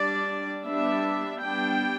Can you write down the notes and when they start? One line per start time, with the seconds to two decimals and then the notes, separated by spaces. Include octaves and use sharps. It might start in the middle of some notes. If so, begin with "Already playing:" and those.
Already playing: G3 D4 D5
0.65 G3 B3 D4 E5
1.41 G3 B3 D4 G5